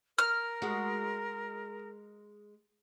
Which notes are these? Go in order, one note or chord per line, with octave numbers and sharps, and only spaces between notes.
A#4 F6
G#3 F#4